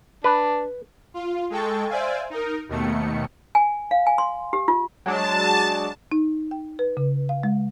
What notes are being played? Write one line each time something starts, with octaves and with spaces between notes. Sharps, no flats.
D4 B4
F4
G#3 A4 G5 C#6 A6
C5 D5 E5 F5 G#5
D#4 A#4
D#2 B2 D#3 A3 C#7
G#5
F5
G#5
C6
G4
F4
F#3 G#3 D4 A5
D#4
G5
B4
C#3
F5
G#3